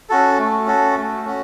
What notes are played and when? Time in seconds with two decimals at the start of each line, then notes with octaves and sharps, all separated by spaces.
0.09 C#4 F#4 A4
0.39 A3
0.66 C#4 F#4 A4
0.96 A3
1.25 C#4 F#4